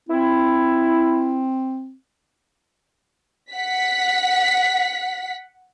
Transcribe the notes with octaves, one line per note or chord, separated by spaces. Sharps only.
C4 E4
F#5 B6